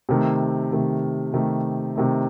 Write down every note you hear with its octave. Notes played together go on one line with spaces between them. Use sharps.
C3 D#3 A3
C3 D#3 A3
C3 D#3 A3
C3 D#3 A3